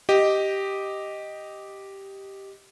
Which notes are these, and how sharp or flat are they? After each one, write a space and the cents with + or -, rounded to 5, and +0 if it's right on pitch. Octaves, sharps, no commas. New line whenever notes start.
G4 -5 D#5 +0